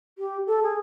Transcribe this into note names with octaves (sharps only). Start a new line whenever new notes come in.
G4
A4
G#4